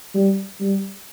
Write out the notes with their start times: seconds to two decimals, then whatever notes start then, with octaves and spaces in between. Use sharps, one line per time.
0.14 G3
0.60 G3